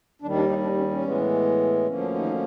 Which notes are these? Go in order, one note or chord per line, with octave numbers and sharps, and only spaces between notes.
D#2 D#3 G3 D4
D4
D#3 D#4
D4
C#4
C#4
A2 E3 G#3 B3
D2 D3 F3 A#3 C#4
D4
D#3 D#4